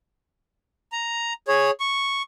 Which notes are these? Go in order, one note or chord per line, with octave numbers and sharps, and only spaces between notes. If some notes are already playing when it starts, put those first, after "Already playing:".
A#5
G#4 C#5
C#6